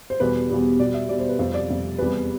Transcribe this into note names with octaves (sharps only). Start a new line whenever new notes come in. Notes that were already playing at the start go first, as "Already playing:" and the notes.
C5
E2 B2 G3 B4
E2 B2 G3
B2 G3 D5
E5
B2 G3 D5
C5
B4
F2 C3 G3 C5
D5
F2 C3 G3
E2 C3 G3 B4